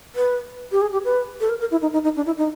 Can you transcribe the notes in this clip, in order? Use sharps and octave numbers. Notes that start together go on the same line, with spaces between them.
B4
G4
G#4
G4
B4
A4
A#4
A#4
E4
D#4
D#4
D#4
D4
E4
D#4